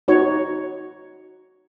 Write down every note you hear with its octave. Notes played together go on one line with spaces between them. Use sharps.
D#4 F#4 C#5